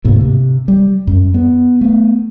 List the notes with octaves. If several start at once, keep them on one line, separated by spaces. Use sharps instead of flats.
D2 G#2 C3 A#3
C3
G3
F#2
B3
A3 B3